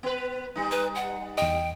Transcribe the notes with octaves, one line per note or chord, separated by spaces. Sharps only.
B3 B4
G3 D#4
B4
F#5
E2 D#5 G5